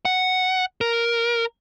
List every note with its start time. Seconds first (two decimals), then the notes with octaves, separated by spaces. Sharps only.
0.05 F#5
0.81 A#4